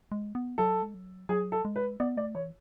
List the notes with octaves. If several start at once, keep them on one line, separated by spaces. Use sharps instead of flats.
G#3
B3
F#3 A4
G#3
F#3
F#3 G#4
A4
G#3
B4
B3 D5
A3 D5
E3 C#5